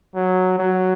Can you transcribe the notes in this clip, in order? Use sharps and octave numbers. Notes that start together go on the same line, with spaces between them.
F#3
F#3